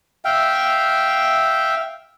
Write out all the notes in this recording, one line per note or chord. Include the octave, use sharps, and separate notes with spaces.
E5 F5 G5